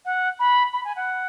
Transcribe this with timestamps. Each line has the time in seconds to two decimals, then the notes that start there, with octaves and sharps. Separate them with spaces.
0.05 F#5
0.40 B5
0.73 B5
0.85 G#5
0.96 F#5